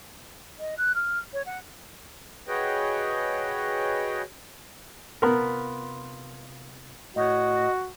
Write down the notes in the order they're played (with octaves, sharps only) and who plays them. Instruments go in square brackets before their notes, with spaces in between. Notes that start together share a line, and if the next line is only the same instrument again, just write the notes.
[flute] D#5
F#6
F6
C#5
F#5
[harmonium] F#4 G#4 B4 C#5 D#5 G5
[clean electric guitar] C3 F4 B5 [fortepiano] B3 A#4
[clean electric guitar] A2 C#5 [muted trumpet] F#4 [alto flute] D#5